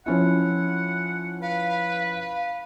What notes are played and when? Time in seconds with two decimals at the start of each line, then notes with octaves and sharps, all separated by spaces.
0.06 F3 C#4 E4 F#5
1.42 B4 F5
2.19 F5